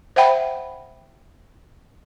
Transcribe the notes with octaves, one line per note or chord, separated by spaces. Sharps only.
C5 E5 F#5 G5 B5